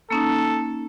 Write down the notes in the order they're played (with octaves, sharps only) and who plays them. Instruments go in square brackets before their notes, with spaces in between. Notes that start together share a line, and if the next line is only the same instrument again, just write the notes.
[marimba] A#3 C#4 D#4 [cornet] A4